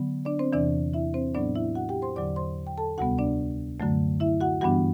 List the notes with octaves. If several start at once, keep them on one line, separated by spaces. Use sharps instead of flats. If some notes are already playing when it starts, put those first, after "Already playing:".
Already playing: D3 F#3 B3
D4 D5
C4 C5
E2 C3 E3 D4 D5
E4 E5
C4 C5
A2 F#3 B3 D4 D5
E4 E5
F#4 F#5
G4 G5
C5 C6
E2 D3 F#3 D5 D6
C5 C6
G5
A4 A5
D2 C3 G3 B3 F#4 F#5
D4 D5
F#2 D3 F#3 A3
E4 E5
F#4 F#5
G2 E3 G3 B3 D4 F#4 F#5